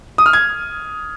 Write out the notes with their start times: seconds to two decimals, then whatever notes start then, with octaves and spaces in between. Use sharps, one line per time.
0.18 D#6
0.26 F6
0.33 G#6